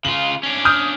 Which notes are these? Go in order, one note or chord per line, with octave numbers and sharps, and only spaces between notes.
C#3 F4 F#7
C#4 D4
D#6 F6 G6